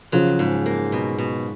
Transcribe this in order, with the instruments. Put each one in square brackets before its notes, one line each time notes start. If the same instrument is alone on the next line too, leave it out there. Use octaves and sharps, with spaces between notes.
[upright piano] C#3 F3 [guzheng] F#3
[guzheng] G#2
A#3
B2
B2